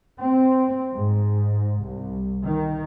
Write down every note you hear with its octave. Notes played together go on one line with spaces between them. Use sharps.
C4
G#2
C2
D#3